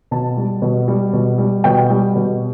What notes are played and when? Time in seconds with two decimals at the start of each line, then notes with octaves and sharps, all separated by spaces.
0.11 B2 A5
0.37 G3
0.62 B2
0.88 G3
1.13 B2
1.38 G3
1.64 B2 G5
1.90 G3
2.16 B2